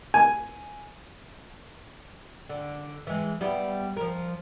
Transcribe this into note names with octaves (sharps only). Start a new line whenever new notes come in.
G#5
D3
E3 G#3
G3 B3 E4
F3 A#4